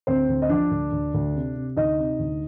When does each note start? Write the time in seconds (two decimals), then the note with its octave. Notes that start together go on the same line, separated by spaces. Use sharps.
0.07 D2 C4 C5
0.28 D2
0.42 D#5
0.49 F3 D4 D5
0.71 D2
0.92 D2
1.14 D2
1.35 C3
1.56 C3
1.77 D2 D#4 D#5
1.99 C3
2.19 D2